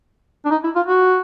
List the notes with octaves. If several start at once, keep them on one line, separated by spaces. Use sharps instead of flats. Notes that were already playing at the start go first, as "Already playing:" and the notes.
D4
D#4
E4
F4
F#4